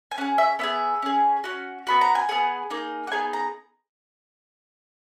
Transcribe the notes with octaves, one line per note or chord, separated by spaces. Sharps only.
G#5
C#4 G#4 F#5
E5
B3 E4 G#4 E5
C#4 G#4
C#4 F#4
B3 F#4 B5
A#5
G#5
B3 E4 G#4 F#5
A#3 D#4 G#4
F#5
B3 D#4 G#4 G#5
A#5